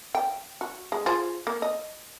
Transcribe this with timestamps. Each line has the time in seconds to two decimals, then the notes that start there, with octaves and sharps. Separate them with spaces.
0.15 G5
0.61 F#4
0.92 G#3
1.06 F4 G#4 C5
1.47 A#3
1.62 D#5